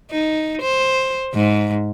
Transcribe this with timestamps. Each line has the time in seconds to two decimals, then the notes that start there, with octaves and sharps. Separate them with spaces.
0.11 D#4
0.62 C5
1.34 G#2